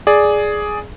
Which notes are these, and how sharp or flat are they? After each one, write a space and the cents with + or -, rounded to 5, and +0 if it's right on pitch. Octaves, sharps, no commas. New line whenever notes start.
G#4 +5 D5 +0